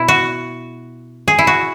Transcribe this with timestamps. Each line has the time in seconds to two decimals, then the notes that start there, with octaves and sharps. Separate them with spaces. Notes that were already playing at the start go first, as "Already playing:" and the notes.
Already playing: B2 E4
0.08 F#4
1.28 G#4
1.39 E4
1.47 F#4